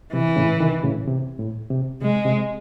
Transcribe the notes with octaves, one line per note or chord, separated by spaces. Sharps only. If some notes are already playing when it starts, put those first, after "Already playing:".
C3 E3
A2 C#3
C3 D#3
A2 C#3
C3
A2
C3
C3 G#3
C3